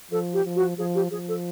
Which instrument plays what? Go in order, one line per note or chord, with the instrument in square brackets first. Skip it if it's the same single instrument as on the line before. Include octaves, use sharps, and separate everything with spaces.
[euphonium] F3 [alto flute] A4
[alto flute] G4
[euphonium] F3
[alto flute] F#4
[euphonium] F3 [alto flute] G#4
[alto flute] G4
[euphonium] F3 [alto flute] G#4
[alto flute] A4